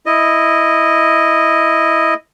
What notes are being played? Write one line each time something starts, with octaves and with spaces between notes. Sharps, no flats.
E4 D#5